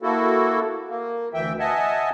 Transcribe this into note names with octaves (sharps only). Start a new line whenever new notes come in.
A#3 E4 F#4 A4
A#3
D2 E3 E5 G5
D#5 E5 F#5 G#5 A5